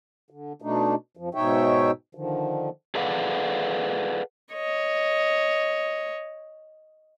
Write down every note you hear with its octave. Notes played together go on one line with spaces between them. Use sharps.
D3
B2 A3 D4 D#4
F2 F3
G#2 B2 D#4 C#5 E5 G5
D3 D#3 F3
G#4 A4 B4 D5 F5 F#5
C#5 D#5